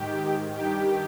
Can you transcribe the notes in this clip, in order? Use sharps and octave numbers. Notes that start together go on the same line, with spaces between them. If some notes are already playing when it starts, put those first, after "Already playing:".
Already playing: G#2 D#3 G4
G2 D#3 G4